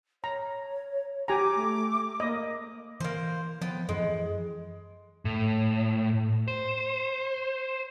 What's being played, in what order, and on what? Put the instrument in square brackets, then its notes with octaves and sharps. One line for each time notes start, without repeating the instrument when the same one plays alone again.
[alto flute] C#5 [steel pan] A#5
[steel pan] G4 G#5 A#5 [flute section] D6
[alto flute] A3
[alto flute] A#3 [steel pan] D#5
[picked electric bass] E3 [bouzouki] A#3 C5
[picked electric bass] F3 [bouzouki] B3 G5
[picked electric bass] F#2 E3 F3 [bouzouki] G#3
[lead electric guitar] A2
C5